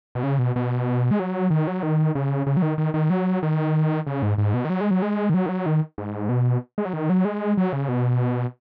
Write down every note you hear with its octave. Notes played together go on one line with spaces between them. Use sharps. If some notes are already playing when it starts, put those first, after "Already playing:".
B2
C#3
B2
B2
G#3
F#3
D#3
F#3
D#3
C#3
C#3
F#3
D#3
D#3
D#3
F#3
D#3
C#3
G#2
G#2
B2
D#3
F#3
G#3
F#3
G#3
D#3
F#3
D#3
F#3
D#3
G#2
B2
G#3
F#3
D#3
F#3
G#3
F#3
C#3
B2